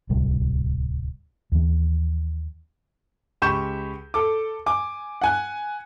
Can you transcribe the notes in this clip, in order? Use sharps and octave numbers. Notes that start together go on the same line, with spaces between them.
D1 C2 G3
D#2 E3
C#2 G4 B5 C#6 G6 E7
A4 D6
G#5 D6
F#5 G#5 F#6